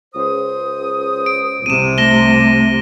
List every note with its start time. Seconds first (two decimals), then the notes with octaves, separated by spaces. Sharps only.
0.14 C#2 C5 D#6
1.26 D7
1.66 C2 C3 D#7 E7
1.98 A3 A#6 E7 G7